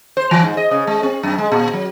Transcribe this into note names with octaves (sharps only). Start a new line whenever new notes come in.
C5
E3
G#2
D#5
C#3
G#3
C4
F#2
G#3
A#2
F#3